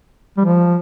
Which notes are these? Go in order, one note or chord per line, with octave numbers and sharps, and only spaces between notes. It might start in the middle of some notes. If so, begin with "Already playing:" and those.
G3
F3